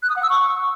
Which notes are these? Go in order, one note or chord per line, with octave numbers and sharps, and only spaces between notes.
F#6
D#6
F#5
E6
C#6